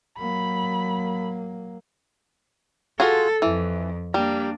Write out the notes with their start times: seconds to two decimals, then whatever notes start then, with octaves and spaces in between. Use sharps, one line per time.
0.18 F#3 A#3 B5
3.00 F4 F#4 G#4 A4
3.42 F2 E3
4.14 G3 A#3 D4